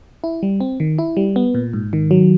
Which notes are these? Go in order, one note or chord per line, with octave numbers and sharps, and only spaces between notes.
E4
G3
C4
D#3
E4
G3
B3
A#2
G#2
D#3
F#3